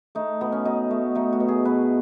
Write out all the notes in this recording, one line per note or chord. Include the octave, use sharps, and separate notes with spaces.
A3 D#4
B2 B3
C#4
B2 D#4
A3
A3 D#4
F#4
B2
G#4
B2 B4